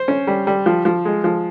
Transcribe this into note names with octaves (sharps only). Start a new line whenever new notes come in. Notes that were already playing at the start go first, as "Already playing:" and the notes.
Already playing: C5
C#4
G3
G3
F3
F3
G#3
F3